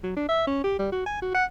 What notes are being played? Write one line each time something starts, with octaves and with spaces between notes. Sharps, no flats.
F#3
D4
E5
C#4
G4
G3
F#4
G#5
F#4
F#5